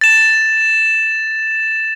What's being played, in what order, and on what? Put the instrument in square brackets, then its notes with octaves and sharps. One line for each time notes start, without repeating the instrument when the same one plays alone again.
[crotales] A6 E7